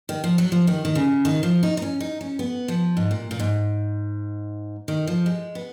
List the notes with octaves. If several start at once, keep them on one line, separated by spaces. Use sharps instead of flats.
D#3
F3
F#3
F3
D#3
D#3
C#3
D#3
F3
D#4
D#4
C#4
D#4
C#4
B3
F3
G#2
A#2
A#2
G#2
D#3
F3
G#3
B3